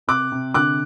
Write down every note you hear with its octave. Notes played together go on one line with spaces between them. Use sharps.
C3 D6 F#6
C3
D3 D6 F#6